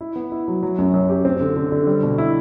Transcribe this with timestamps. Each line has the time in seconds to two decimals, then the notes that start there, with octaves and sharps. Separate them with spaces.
0.01 E4
0.16 B3
0.32 E4
0.48 F#3
0.63 F#3
0.79 F#2
0.94 F#2
1.09 G4
1.25 C4
1.40 D3
1.56 D3
1.72 D3
1.87 G3
2.03 B2
2.18 E4